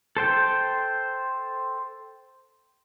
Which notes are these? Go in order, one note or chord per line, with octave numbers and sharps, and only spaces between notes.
A4 C5 G5